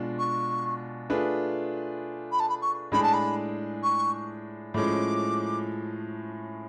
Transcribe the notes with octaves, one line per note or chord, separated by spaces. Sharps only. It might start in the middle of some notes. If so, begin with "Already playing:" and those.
Already playing: B2 G#3 D4 F4
C#6
A3 D4 F4 G#4 B4
B5
A5
B5
C#6
A2 G#3 D4 G#4 B5
A5
B5
C#6
A2 F3 G#3 C#4 D6